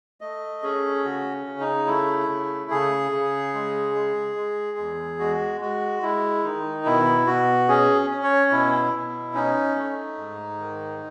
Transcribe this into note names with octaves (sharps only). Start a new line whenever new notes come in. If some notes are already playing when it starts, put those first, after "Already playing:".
A3 D#5
C#4 G#4
C#3 F#4
C#3
D#4
A3 E4
C#3
C#3 G#4
C#3
G#3
G#3
G#3
E2
G#3 F#4
G#3 F#4
G#3 E4
D#3 D#4
B2 E4
B2 F#4
C#4 G#4
C#4
C#5
B2 E4
B2
C#4 D#4
A3
G#2
D#3